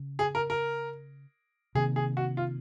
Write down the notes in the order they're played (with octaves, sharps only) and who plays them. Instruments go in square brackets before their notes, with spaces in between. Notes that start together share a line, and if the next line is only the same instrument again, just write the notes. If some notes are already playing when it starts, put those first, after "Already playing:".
Already playing: [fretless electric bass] C#3
[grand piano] G#4
A#4
A#4
[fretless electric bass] C3 D#3 A#3 [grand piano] G#4
[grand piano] G#4
F#4
F4